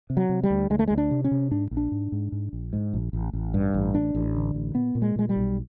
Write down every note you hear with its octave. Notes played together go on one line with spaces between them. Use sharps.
C3
F#3
C3
G3
D2
D2 G#3
A3
D2 G#3
D4
C3
C#4
C3
G#2 D4
A#1
D4
G#2
G#2
G#2
A#1
G#2
A#1
A1
A1
G2
A1
A1 D4
A1
D3
A1
A#2 B3
A#2
G#3
A#2 G#3
G3
B1